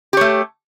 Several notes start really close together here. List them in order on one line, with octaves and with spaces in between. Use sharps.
G4 C#5 A3